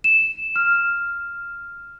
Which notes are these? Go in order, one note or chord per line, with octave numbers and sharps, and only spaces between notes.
E7
F6